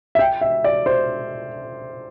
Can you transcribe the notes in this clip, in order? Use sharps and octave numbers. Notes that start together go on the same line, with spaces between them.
E5
G5
E5
D5
C5